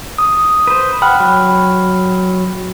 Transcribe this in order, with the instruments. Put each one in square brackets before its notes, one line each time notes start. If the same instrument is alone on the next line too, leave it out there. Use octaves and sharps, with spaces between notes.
[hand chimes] D#6
[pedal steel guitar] B4 C5
[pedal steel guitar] F#5 [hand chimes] G5 B5 F6
[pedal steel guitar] F#3